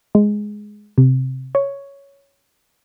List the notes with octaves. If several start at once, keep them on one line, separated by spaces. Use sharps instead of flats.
G#3
C3
C#5